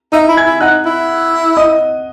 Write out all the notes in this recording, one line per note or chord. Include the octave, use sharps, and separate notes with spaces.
D#4 E5 E6
E4
G#5 G#6
E4
D#4 F#5 F#6
E4
D#5 D#6